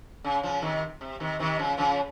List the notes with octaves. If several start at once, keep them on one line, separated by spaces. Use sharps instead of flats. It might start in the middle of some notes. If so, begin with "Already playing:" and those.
C#3
C#3 F3
C3 D#3
C3
C3 D#3
C3 D#3
C#3 F3
C#3 F3